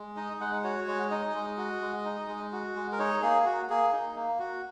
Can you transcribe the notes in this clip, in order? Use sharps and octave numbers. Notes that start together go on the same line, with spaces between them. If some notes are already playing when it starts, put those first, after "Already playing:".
Already playing: G#3
D#4 D#5
G#3 F#5
F#4 C#5
G#3 C#5
D#4 D#5
G#3
F#4
G#3
D#4
G#3
F#4
G#3
A#4
D#4 C#5
A#3 G#4
F#4
A#3 G#4
D#4
A#3
F#4